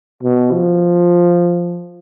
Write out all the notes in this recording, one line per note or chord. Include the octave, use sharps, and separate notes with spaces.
B2
F3